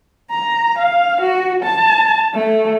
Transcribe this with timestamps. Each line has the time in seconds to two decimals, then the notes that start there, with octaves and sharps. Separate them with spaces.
0.31 A#5
0.78 F5
1.21 F#4
1.63 A5
2.34 A3